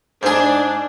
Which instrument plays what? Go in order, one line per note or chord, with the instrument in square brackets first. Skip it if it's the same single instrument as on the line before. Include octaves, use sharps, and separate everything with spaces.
[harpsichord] G#2 G#4 [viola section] D4